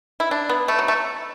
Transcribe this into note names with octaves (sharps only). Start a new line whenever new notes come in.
E4
D4
B3
A3
F#3
A3